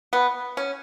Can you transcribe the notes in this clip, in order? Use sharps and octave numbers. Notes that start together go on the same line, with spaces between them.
B3
C#4